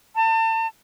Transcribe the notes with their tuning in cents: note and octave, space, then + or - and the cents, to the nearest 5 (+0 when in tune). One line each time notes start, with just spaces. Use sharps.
A5 +35